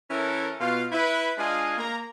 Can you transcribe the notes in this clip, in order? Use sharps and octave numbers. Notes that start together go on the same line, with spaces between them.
E3 C#4 E4 A4 A#4
B2 F4 F5
E4 B4
G#3 D4 F4 D#5 F5 G#5
A#3 A#5